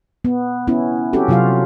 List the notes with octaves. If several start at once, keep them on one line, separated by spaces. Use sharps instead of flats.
B3
B3 C#4 E4
C4 C#4 F#4 G4 A4
C3 F#3 F4 F#4 F5